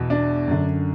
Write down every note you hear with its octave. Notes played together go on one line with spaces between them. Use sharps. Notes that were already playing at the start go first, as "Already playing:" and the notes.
Already playing: E2 B2
D4
F#2 D3